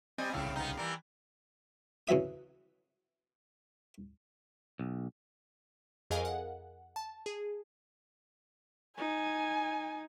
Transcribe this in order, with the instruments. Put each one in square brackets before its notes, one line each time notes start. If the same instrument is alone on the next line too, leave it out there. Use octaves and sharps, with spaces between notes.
[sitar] G3 [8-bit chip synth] C4 D#5 G#5
[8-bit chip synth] C2 C#3 F5 [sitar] A2 E4
[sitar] B3 D#4
E3 G3 A#3
[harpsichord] C#3 E3 F#3 E5 D#6
[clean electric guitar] B1
[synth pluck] F2 G#4 A#4 D#5 F5 G#5
F#5
A5
G#4
[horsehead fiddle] D#4 [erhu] G#5